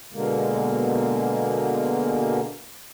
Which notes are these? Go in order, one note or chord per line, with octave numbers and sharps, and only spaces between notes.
B2 D3 G#3 A#3